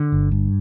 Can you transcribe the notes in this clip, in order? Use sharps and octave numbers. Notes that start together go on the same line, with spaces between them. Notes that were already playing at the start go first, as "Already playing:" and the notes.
Already playing: D3
G1
G2